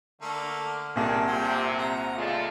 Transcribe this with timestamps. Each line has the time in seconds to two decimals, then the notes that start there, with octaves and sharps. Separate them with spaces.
0.22 D3 A3 A#3 F6
0.96 C2 A#2 G#3 D4 A4 A#4 F#5 G5
1.27 C3 F#3 G#4 F#5 G5
1.79 A#5
2.16 C#3 G#3 A3 F4 D5 F5